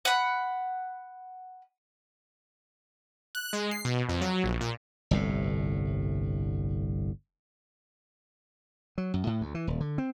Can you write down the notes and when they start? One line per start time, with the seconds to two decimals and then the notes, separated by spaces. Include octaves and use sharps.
0.05 F#5 B5
3.35 F#6
3.53 G#3
3.71 C7
3.85 B2
4.09 F2
4.21 F#3
4.44 A#1
4.61 A#2
5.11 G1 C2 A2
8.98 F#3
9.14 F#2
9.27 A2
9.41 D2
9.55 E3
9.67 D#1
9.80 D3
9.98 C4